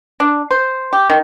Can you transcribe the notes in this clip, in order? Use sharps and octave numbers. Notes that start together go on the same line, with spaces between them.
D4
C5
G4
D#3